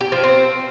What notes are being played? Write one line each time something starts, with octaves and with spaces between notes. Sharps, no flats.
G4
F3
C4